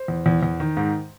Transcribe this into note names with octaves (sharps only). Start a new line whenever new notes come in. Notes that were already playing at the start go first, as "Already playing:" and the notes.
Already playing: C5
E2
E2
E2
D#3
G#2